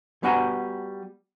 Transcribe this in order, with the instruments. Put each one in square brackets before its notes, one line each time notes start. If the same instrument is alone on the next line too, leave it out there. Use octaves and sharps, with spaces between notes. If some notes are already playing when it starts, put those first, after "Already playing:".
[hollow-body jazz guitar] G3 B3 F#4 F#5 G#5 A#5